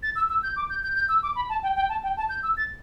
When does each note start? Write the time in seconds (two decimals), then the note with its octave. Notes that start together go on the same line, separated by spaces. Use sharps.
0.03 A6
0.16 E6
0.30 E6
0.43 G6
0.56 D6
0.70 G6
0.83 G6
0.95 G6
1.09 E6
1.23 D6
1.36 B5
1.49 A5
1.63 G5
1.76 G5
1.89 A5
2.03 G5
2.17 A5
2.29 G6
2.43 E6
2.57 A6